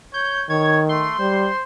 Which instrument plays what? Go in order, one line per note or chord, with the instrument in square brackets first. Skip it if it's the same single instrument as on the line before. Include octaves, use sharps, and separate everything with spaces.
[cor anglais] C#5 [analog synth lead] G6
[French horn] D#3 [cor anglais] C#5 [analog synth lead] G#6
[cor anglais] A3 [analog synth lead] C6
[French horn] G3 [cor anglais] C5